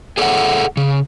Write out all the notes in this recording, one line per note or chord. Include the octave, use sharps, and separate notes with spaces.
G#4 A4 C#5 D#5 E5 F#5
C#3